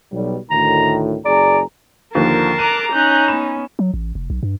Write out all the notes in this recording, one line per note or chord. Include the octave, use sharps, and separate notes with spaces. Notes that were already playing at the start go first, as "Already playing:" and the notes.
B1 G3
D2 A2 D#3 A#5
F#1 G#4 D5 A#5
D#2 D3 F3 A#4 A5 C7
A#5 D6 F#6 D#7
C#4 D#4 A#5 F#6 G6
B3 B5 E7
F#3
A1
F1
B1
G2